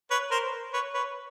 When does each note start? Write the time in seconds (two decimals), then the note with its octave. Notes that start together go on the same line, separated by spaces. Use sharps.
0.11 B4 C#5
0.31 A#4 C5
0.73 B4 C#5
0.94 B4 C#5